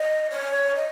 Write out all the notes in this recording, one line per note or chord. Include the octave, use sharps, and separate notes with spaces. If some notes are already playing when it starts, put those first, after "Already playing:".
Already playing: D#5
C#5
D#5